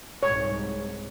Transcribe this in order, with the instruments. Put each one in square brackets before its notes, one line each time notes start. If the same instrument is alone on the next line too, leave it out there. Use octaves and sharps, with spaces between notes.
[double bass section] C2 G#2 [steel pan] C#5